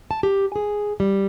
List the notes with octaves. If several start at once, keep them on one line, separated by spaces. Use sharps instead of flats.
A5
G4
G#4
G3